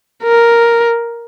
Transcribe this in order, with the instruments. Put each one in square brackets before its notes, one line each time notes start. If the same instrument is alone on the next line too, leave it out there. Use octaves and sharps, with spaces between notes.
[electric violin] A#4